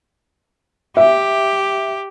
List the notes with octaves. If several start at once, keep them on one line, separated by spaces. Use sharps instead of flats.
G4 E5